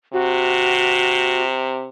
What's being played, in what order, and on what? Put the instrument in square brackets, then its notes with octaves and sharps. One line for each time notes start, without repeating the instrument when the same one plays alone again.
[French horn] C3 [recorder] F#4